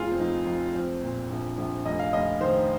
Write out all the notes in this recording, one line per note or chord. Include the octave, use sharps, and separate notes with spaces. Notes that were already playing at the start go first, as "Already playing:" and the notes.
Already playing: F1 F2 F4 G#4
C4
F2 D#4
F2
F3 C4
A#2
A#1
A#1
F1 D#5
F5
F1 D#5
D#3 C5